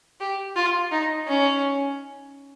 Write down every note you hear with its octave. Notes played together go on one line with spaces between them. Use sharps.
G4
F4
D#4
C#4